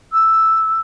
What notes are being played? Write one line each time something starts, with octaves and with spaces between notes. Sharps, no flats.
E6